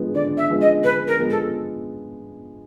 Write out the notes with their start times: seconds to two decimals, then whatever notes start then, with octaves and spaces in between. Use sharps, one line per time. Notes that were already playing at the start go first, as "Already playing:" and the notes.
Already playing: D3 F3 G#3 B3
0.15 D3 D5
0.37 E5
0.49 F3 G#3 B3
0.61 D#5
0.83 D3 B4
1.08 A#4
1.19 F3 G#3 B3
1.30 A4